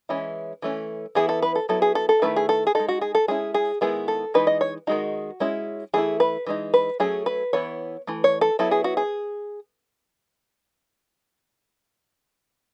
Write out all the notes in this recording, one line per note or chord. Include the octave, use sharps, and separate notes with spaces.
E3 G#3 C#4 E4
E3 A3 C#4
E3 B3 E4 G#4
A4
B4
A4
F#3 B3 E4 A4
G#4
A4
A4
D#3 F#3 A3 E4 B4
G#4
A4
G#4
G#3 D#4 A4
F#4
G#4
A4
G#3 C#4 E4 G#4
G#4
D#3 G#3 B3 E4 G#4
A4
E3 G#3 D#4 B4
D#5
C#5
D#3 G#3 D#4 F#4
G#3 C#4 E4
E3 A3 E4 G#4
B4
E3 G#3 D#4
B4
F#3 A3 C#4 G#4
B4
E3 B3 E4 C#5
E3 A3
C#5
A4
F#3 B3 E4 A4
G#4
F#4
G#4